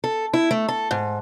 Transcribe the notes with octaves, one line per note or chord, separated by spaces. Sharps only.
A4
E4
A3
A4
G#2